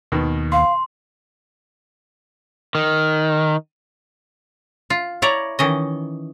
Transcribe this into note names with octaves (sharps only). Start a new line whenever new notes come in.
D#2 B2 D#3
F5 C6
D#3
F4
E4 C#5 D5 A#5
D#3 E3 C#4 D#5